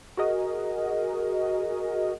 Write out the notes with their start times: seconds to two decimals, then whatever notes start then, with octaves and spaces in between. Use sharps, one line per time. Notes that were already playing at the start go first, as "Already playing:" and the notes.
0.17 F#4 G#4 A#4 D#5